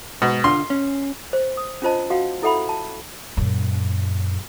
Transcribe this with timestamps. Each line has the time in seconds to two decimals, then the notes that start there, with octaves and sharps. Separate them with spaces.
0.22 G#2 B2
0.44 D3 D4 F4 C6
0.70 C#4
1.33 C5
1.57 D#6
1.82 C#4 D4 F4 C5 D#5 A5
2.10 F#4 F5 F#5
2.42 E4 A4 E5 F#5 B5
2.69 A5
3.37 F#2 A#2